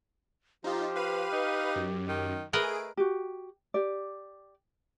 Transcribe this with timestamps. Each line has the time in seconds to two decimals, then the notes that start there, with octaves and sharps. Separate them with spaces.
0.64 F3 D#4 F4 G4
0.96 B4 F5 D#7
1.33 D#4
1.76 F#2
2.08 D#3
2.53 A3 G#4 A#4 B4 D#5 D7
2.97 F#4 G4
3.74 G4 D5